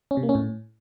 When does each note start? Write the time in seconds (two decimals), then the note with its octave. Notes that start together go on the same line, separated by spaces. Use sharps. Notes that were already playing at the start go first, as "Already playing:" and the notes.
0.11 C#4
0.17 C3
0.23 A#3
0.29 C#4
0.35 A2